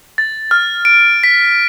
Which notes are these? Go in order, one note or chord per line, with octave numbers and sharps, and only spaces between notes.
A6
F6
D7
B6